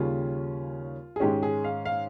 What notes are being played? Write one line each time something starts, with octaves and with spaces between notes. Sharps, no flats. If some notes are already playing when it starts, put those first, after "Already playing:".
Already playing: D#2 C#3 G3 C#4 F4
G#4
G#2 D#3 G#3 C#4 G4
G#4
F5
F5